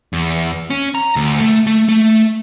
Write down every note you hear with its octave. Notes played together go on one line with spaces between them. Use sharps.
E2
C#4
A#5
D2
A3
A3
A3